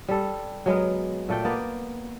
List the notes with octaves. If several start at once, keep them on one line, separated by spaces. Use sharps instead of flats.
G3 A4
F#3 G#3 B3 A#4
A#2 A3 D5 G5
A#3 B3 B4 D5